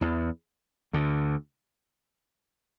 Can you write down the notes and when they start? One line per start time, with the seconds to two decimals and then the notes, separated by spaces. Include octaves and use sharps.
0.01 E2 E3
0.93 D2 D3